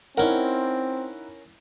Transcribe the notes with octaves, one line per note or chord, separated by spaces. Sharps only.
C4 C#4 D#4 E4 A#4 F#5